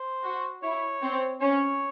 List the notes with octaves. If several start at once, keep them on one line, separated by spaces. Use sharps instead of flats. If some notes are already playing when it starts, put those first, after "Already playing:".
Already playing: C5
F#4
E4 C#5
C4
C#4 C#5